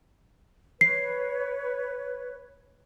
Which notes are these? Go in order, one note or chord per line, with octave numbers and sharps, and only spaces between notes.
B4 C#5 C7